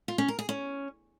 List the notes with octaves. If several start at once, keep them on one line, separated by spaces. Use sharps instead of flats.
F4
C#4
A#4
G#4
C#4